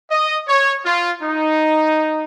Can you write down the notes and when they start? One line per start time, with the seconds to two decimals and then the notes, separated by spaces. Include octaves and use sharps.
0.11 D#5
0.48 C#5
0.85 F4
1.22 D#4